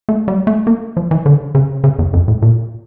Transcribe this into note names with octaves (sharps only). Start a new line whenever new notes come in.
A3
G3
A3
A#3
F3
E3
D3
C#3
C#3
E2
F2
A2
A#2